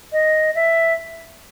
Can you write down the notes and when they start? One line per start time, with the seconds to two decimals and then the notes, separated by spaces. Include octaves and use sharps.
0.12 D#5
0.55 E5